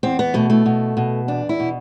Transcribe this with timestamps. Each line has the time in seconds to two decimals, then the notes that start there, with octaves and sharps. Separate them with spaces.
0.03 E2 C4
0.19 B3
0.34 B2 A3
0.50 A3
0.66 B2
0.97 B2
1.28 E2 D4
1.49 E4
1.60 B2